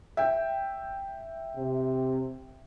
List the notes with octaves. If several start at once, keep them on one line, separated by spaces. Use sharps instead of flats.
E5 G5
C3